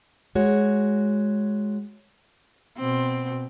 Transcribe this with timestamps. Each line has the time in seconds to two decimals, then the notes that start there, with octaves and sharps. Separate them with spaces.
0.35 G#3 F#4 C#5
2.78 B2 C4